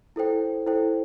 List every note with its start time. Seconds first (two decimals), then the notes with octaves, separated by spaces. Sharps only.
0.16 E4 A4 C5 G5
0.66 E4 A4 C5 G5